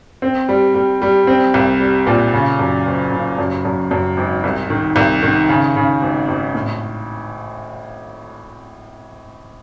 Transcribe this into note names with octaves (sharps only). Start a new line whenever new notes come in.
C4
G3
G3
G3
C4
C2
G3
A#2
C#3
F#2
F#1
C#3
F#2
F#2
F#2
G#1
C2
D#3
C2
D#3
C#3
C#3
G#1
G#1
A2